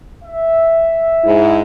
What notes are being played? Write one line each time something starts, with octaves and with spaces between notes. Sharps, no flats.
E5
G#2 E4